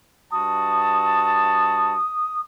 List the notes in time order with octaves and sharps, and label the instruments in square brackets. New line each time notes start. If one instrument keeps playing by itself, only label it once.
[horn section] G2 F#4 A5 [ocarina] D#6